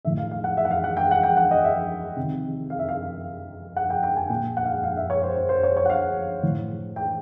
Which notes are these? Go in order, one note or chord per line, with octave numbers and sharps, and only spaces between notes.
A2 E3 E5
F5
F5
F#5
E5
F#5
F5
F#5
G5
F#5
G5
F#5
D#5
E5
C3 D#3
F5
E5
F5
F#5
G5
G5
G#5
A#2 G5
F#5
F5
F#5
F5
E5
C#5
C5
C5
C5
C#5
C#5
F#5
F5
A2 E3
G5